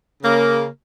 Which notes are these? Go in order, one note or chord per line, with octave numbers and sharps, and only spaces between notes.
C#3 A#3